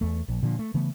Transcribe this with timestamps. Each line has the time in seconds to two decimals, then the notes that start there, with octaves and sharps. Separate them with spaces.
0.01 E2 A3
0.28 A#1
0.42 A#2 D3 F3
0.59 A3
0.74 C#3 E3 A3 B3